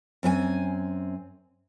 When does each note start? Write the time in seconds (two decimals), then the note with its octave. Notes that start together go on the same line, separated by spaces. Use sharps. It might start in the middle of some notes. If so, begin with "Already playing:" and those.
0.23 F#2 C4 G#4 G#5